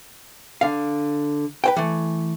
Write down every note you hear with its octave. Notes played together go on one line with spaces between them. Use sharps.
D3 F5
B4 C5 G5
E3 A3